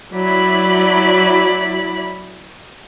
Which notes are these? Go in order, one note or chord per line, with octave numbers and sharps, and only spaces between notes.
F#3 E4 D5 B5